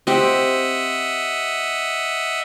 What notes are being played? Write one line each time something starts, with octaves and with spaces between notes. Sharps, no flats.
C4 G4 D#5 E5 F#5